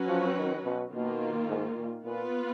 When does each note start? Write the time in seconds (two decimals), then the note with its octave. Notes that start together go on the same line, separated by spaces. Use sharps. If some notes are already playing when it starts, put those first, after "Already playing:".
Already playing: F#3 C#4 F#4 B4
0.08 F3
0.37 D#3
0.65 B2
0.92 B2 D#3 A#3 F4
1.48 G#2
1.77 A#2
2.04 A#2 B3 F4 B4